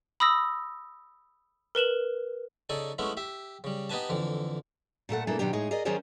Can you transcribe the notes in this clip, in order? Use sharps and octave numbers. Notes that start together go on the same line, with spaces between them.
B5 D#6 E6 A#6
A#4 B4 E7 F#7
C#3 D#4 A4 D5 G#5
G#3 A3 B3 C#4 E4
G4 E5
C#3 G3
B3 D#4 G4 B4 G#5 A5
F2 D3 E3
A#2 A3 A4 F#5
B2 G#3 A#3 D4 E4 A4
B2 D#3 F#3 D4 G4
A2 G#3 D#4 G#4
G#4 A#4 D5 D#5
D#3 F#3 C#4 G#4 C5 D5